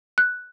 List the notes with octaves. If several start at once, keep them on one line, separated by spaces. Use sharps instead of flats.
F#6